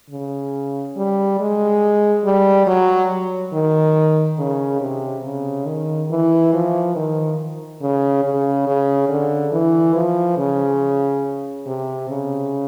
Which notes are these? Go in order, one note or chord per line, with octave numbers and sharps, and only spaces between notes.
C#3
G3
G#3
G3
F#3
D#3
C#3
C3
C#3
D#3
E3
F3
D#3
C#3
C#3
C#3
D3
E3
F3
C#3
C3
C#3